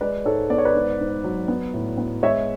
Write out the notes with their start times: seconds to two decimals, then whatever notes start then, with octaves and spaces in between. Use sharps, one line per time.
0.01 G#3 B4 D5
0.25 G#2 A4 C#5
0.50 B3 D5
0.58 C#5
0.65 B4 D5
0.75 G#2
1.00 G#2
1.24 F#3
1.48 B3
1.74 A2
1.98 B3
2.23 G#3 C#5 E5